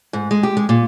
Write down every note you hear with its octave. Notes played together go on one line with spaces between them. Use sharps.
G#2
G#3
G4
G#3
A#2